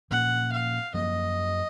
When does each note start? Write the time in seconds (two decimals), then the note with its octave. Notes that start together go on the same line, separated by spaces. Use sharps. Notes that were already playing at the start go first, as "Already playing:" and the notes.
0.11 A#2 F3 A#3 C#4 F#5
0.52 F5
0.94 F#2 F3 A#3 D#5